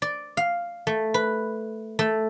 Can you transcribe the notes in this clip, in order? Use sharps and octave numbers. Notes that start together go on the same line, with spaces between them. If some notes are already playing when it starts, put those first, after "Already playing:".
D5
F5
A3
B4
A3